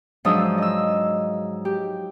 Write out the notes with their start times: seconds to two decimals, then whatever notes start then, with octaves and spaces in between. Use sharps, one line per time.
0.25 G#2 F3 F#3 D4 D#6 E6
0.58 D#5 E6
1.65 G4